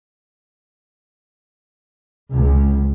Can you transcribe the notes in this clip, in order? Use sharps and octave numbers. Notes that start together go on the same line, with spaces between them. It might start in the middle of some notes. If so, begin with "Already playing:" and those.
C#2